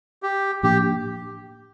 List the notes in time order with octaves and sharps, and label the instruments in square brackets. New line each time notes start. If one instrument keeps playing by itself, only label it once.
[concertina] G4
[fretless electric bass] A2 F3 A#3 D4 [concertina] G4